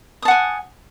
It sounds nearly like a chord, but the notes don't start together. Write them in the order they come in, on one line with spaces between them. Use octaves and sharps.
D#6 A5 F#5 G#5